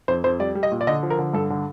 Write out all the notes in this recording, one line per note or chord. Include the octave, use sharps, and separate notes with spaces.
F2 C5
F2 C5
G3 D5
G3
D#5
A#2
D5
D3 D#5
F3
A#4
D3
G2 A4
D3